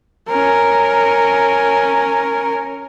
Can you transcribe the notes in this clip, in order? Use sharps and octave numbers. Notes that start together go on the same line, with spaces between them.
C#4 A#4